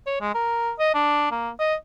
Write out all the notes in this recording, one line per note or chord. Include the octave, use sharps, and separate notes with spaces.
C#5
G#3
A#4
D#5
D4
A#3
D#5